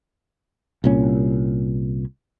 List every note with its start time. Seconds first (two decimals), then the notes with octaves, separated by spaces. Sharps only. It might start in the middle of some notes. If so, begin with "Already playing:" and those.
0.84 C2 A#2 C#4